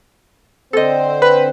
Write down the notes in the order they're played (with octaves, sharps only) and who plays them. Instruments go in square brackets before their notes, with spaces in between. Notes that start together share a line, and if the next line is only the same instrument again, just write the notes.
[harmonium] D3 C4 C5 [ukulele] A4 D#5
[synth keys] B4